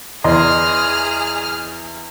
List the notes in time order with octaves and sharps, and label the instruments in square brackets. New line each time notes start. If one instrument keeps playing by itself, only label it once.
[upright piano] E2 [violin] G#4 F6 [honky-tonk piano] D5 D#5 C6